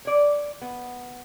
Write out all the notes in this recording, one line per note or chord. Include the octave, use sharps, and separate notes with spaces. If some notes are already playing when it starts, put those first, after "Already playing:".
C#5 D5
B3